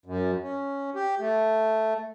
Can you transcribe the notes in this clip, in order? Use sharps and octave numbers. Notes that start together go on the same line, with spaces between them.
F#2
C#4
G4
A3